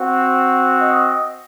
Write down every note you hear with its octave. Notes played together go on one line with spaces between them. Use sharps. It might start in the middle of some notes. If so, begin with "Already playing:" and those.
Already playing: C4 F#4
D#5